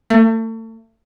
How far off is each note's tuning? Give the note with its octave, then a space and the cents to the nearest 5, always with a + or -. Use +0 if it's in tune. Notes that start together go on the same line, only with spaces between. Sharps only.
A3 +35